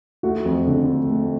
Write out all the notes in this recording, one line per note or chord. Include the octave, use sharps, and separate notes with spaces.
A3 F#4
F2
D3
A3
A3